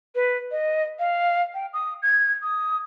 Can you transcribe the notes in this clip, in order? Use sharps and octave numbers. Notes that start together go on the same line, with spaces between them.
B4
D#5
F5
G5
D#6
G#6
D#6